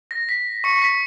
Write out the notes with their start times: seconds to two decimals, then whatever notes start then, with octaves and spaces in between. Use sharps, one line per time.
0.11 A#6
0.29 B6
0.64 C#6 C#7
0.82 B6